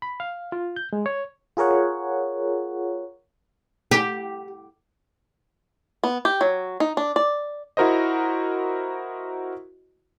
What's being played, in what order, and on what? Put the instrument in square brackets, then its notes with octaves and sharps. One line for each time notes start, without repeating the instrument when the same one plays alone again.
[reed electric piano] B5
F5
F4
G6
G#3
C#5
[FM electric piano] F4 G#4 A#4 C#5 F#5
[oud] G4
[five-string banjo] B3
G4
F#3
D#4
D4
D5
[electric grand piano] E4 F#4 A#4 C5 D#5